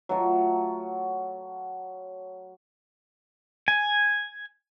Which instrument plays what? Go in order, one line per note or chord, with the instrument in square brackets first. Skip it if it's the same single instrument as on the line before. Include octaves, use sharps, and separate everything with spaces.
[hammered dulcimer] F#3 A3 F4 C#5
[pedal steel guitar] G#5